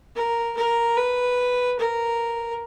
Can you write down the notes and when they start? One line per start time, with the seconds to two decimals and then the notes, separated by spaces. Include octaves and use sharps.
0.16 A#4
0.57 A#4
0.97 B4
1.79 A#4